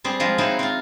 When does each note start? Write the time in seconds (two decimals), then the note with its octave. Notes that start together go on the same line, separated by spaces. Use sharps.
0.04 G3 C4 G#4
0.20 F3 G#3
0.38 F#3 C4 D#4 E4 C5
0.59 C4 F4